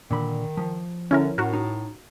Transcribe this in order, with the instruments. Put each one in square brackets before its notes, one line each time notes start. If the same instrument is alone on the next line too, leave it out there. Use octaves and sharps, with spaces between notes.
[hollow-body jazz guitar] A#2 D3 B5 [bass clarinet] D#3
[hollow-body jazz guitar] F3
[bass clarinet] D3 [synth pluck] C#4 E4 A#4
[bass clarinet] A2 [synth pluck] F#4 A#4
[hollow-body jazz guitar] D#4